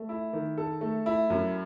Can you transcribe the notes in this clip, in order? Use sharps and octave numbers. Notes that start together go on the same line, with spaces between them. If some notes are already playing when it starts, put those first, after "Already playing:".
Already playing: A3
E4
D#3
A4
A3
E4
F#2